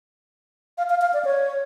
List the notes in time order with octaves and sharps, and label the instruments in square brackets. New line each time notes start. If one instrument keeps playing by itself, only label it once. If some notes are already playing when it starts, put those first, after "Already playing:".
[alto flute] F5
F5
F5
D5
C#5